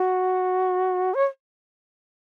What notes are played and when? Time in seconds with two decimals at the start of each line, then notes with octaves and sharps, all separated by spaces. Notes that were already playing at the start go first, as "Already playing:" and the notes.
Already playing: F#4
1.14 C#5